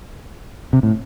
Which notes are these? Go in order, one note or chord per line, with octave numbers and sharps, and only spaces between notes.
C3
A2